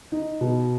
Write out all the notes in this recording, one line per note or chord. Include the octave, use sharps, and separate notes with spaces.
D#4
B2